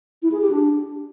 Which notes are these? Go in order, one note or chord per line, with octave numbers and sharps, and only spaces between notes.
E4
G#4
G4
D4